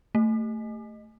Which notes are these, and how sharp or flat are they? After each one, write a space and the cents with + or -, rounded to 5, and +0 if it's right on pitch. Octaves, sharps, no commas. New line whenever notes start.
A3 +15